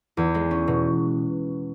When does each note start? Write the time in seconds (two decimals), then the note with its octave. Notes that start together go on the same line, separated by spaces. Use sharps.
0.17 E2
0.35 G#3
0.51 C#4
0.68 B2